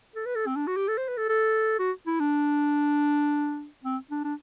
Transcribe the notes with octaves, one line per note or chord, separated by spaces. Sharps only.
A4
B4
A4
C4
D4
F#4
G4
A4
C5
B4
A4
A4
F#4
E4
D4
C4
D4
D4